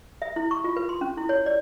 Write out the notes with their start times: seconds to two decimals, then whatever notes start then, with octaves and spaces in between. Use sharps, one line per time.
0.22 E5
0.36 E4
0.51 C#6
0.64 F4
0.76 B4
0.89 C6
1.01 C#4
1.17 E4
1.29 C#5
1.46 D5